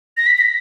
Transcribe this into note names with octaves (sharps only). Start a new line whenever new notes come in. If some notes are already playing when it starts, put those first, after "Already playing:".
A#6
B6
B6